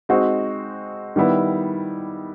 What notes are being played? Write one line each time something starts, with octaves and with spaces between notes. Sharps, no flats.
G#3 C4 D#4 F#4
D#3 G3 B3 E4